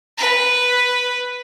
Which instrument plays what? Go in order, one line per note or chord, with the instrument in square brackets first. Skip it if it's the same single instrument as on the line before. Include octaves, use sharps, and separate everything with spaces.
[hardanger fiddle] B4